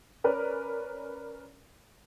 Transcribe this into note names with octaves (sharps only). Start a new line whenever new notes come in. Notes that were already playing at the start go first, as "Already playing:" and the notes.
C#4 A#4 B4 D5